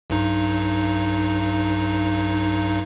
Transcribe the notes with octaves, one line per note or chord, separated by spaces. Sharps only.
B1 G2 D#4